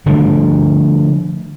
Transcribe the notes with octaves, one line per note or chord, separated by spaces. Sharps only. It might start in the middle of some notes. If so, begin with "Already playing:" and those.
D3 F3 G3 A3